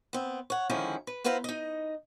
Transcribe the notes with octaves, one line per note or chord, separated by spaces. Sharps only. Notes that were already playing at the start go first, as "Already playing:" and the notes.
B3 C4
C#5 F#5
D3 D#3 F3 G#3 C#4 E4
B4
B3 E4 B4 C5 F5 A#5
D#4 D#5